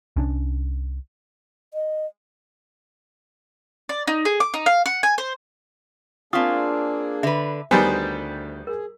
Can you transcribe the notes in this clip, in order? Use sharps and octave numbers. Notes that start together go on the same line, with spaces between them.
C2 C#4 D4
D#5
D5
D#4
G#4
D6
D#4
F5
F#5
G#5
C5
A#3 C4 D4 F4 G#4 F5 C#6 D#6
D3 B4 E5
D2 D#3 G3 B3 C5 G#5
G#4 A#4